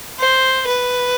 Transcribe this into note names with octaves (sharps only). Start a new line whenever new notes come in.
C5
B4